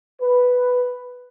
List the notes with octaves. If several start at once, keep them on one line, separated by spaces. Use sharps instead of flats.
B4